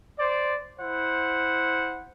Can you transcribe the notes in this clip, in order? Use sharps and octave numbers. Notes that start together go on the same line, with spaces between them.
C5 D5
E4 C5 F#5